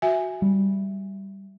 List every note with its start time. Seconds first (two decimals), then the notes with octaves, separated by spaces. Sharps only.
0.02 F#4 E5 G#5
0.42 G3